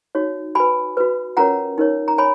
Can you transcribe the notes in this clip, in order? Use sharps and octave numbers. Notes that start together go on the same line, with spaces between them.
D#4 F#4 C#5
F#4 B4 G#5 B5
F#4 B4
C#4 F4 A#4 C#5 F#5 A#5
D#4 A#4 C#5
A#5
C#5 G#5 B5